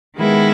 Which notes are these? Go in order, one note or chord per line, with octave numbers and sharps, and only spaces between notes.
D#3 G#3 B3 E4